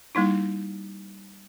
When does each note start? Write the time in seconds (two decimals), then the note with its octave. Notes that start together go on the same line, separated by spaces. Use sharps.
0.15 G3 A#3 D#4 E4